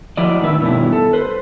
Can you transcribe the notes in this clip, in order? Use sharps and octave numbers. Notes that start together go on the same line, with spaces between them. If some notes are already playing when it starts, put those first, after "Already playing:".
F3 F#3 E4 D5 D#5
A2 D3 D#3 B4 E5
G2 B2 D#3 C#4 E4
A4
B4 C5